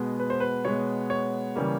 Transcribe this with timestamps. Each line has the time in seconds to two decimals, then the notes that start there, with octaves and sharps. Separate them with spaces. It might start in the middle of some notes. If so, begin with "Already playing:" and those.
Already playing: B2 G#3 B3
0.20 B4
0.30 C5
0.40 B4
0.65 B2 G#3 B3 C#5
1.10 C#5
1.56 C#3 E3 G3 A#3